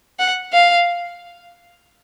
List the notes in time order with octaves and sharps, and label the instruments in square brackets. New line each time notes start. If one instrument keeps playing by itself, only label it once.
[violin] F#5
F5